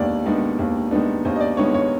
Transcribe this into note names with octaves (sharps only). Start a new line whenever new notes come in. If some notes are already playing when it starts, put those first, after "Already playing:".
Already playing: D#2 D#3 G#3 B3 D4 D5
D#3 G#3 B3 D4
D#2
D#3 G#3 B3 D4
D#2 C5
D#5
D5
D#3 G#3 B3 D4 C#5
C#5